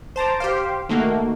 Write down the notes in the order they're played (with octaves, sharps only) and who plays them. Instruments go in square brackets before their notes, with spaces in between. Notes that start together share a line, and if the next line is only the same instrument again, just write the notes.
[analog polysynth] C5 A5 A#5 D6
G4 C5 F5
D#3 A3 A#3 F#4